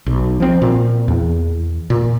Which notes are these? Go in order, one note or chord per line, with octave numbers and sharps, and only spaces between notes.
B1
F3 C4
A#2
E2
A#2